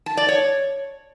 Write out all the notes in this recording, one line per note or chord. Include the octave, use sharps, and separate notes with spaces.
A5
D5
C#5